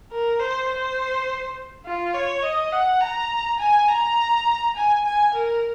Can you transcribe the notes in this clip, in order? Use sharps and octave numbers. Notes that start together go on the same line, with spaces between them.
A#4
C5
C5
F4
C#5
D#5
F#5
A#5
G#5
A#5
G#5
G#5
A#4